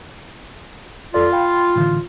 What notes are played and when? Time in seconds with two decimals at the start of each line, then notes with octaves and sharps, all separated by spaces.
1.14 F2 F4 A4 D5
1.32 F5 G5 B5
1.76 A2 D3 E3